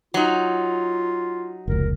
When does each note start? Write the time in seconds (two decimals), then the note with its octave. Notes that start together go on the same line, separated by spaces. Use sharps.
0.14 F#3 D#4 F4
1.68 F1 C#2 A#4